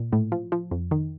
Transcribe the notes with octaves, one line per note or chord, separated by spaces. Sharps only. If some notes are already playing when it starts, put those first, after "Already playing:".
Already playing: A#2
A2
F3
F3
F2
D#3